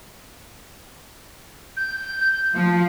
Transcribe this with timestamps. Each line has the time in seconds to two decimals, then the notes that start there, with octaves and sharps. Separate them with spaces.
1.76 G6
2.54 F3